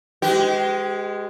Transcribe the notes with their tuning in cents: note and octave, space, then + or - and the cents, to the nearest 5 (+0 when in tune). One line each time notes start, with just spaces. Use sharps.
G#3 +0 G4 -30 B4 +45